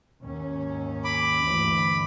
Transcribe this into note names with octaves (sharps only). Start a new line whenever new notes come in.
D#2 G#2 C#4
B5 D6
D2 G2 E3